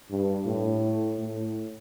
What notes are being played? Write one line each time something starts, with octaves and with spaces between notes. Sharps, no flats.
G2
A2
A2